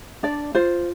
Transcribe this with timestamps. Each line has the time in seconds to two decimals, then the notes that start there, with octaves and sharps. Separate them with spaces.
0.23 D4 D5
0.55 F4 C5